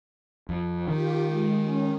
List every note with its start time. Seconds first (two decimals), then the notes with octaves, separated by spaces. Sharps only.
0.49 F2
0.88 D#3 F4 G4
1.24 G#3
1.62 C#4